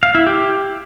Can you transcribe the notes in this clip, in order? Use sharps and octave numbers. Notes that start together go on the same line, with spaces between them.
F5
E4
G4